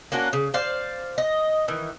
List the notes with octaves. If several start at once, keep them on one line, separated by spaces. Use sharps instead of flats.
A#3 C#4 D4 F#4
C#3
C5 D5 F5
D#5
D#3 E3